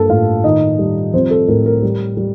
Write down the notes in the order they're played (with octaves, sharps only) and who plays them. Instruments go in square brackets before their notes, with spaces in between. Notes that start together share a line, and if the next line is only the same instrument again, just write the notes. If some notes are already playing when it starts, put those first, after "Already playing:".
Already playing: [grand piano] G2 A#3 A4 A5
A2 F4 F5
D#3 D#4 D#5
G3
F3 C4 C5
A4
A2 A#4
A#4
G3
G3